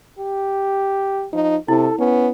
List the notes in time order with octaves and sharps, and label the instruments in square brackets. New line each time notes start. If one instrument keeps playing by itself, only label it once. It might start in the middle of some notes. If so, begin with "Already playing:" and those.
[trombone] G4
[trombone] F3 [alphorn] D#4
[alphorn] C3 [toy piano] E4 [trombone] A4
[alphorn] B3 [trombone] C#4